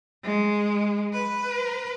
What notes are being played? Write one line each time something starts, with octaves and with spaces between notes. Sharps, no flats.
G#3
B4